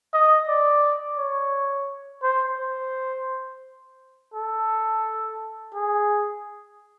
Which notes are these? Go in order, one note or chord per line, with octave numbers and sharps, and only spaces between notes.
D#5
D5
C#5
C5
C5
A4
G#4